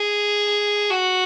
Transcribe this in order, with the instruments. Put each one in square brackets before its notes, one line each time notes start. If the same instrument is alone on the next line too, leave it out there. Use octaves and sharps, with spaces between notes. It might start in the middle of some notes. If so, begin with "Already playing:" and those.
Already playing: [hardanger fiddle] G#4
F#4